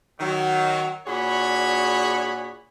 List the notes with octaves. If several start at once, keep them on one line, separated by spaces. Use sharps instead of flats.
D#3 F#3
A#2 D4 F#4 G#4 C#5 B5